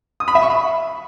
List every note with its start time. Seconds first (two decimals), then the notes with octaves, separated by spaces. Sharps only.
0.20 D#6
0.28 B5
0.35 E5
0.43 C#6
0.50 B5